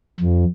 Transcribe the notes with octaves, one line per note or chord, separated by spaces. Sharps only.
F2